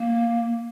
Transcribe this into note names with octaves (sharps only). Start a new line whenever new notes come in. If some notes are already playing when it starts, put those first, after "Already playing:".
Already playing: A#3